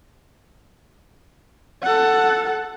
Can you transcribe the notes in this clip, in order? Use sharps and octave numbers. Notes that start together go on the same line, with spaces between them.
A4 F#5